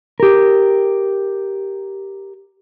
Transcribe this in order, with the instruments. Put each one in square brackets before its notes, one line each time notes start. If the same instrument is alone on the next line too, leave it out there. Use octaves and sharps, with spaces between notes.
[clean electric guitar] G4 A#4